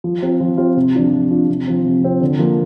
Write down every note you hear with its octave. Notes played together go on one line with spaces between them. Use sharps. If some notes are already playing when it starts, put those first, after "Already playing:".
F3
C4 F4
F3
C4 F4
C3
F3 D4 F4
C3
F3 D4 F4
C3
F3 C4
C3
F3 C4
D3
F3 A#3 F4